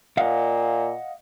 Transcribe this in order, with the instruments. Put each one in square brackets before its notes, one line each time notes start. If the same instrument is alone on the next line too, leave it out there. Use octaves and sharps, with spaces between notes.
[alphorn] A#2 [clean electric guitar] D#5 F5 F#5